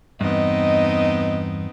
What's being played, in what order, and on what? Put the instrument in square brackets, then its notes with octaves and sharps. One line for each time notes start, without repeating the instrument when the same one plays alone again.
[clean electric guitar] E2 G2 [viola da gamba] B3 C4 D#4 [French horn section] D#5